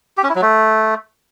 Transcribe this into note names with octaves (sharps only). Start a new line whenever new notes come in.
G4
C#4
E4
F#3
A3